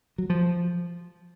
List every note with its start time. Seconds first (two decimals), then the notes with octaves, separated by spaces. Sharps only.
0.18 F#3
0.30 F3